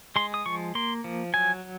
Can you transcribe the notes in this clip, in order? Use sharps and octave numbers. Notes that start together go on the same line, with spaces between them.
G#3 C6
D#6
F3 C#6
A#3 C6
F3
F#3 G#5